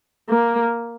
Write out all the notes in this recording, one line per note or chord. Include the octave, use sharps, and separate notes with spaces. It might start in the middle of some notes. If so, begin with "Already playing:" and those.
A#3